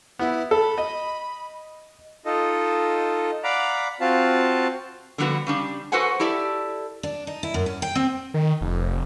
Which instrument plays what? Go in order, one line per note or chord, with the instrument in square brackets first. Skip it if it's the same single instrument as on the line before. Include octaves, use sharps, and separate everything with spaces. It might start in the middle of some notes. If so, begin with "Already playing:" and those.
[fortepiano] B3 [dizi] E4
[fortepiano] A4 [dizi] B5
[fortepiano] D#5
[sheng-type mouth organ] D#4 F4 A4 D#5
D5 F5 F#5 A#5 B5 D6
C4 F4 F#4 F5 A5
[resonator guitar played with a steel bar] D3 F3 G3 B3 F#4 B4
C#3 G3 D4
F#4 A4 B4 C5 F#5 G#5
E4 G4 A4 D5 E5
[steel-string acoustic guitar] D4
D#4
E4
F#2
C#4
G5
C4
[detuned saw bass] D#3
F1